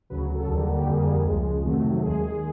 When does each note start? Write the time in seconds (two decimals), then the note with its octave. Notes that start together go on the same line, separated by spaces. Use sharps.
0.10 D2 C#3 F#3 B4
0.35 A4
0.48 D#2 D3 G3 A#3 G#4
0.61 F#4
0.74 G4
0.86 F2 D3 G3 A#3 G#4
1.24 C#2 C#3 F3 G#3
1.63 F2 C3 D#3 F#3 A3
2.02 D#2 D#3 G#3 G#4